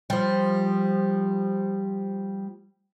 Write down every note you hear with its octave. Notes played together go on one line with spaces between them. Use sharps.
F3 G3